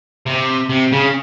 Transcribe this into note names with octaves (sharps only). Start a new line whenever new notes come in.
C3
C3
C#3